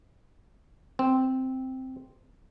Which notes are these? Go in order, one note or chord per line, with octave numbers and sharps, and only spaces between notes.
C4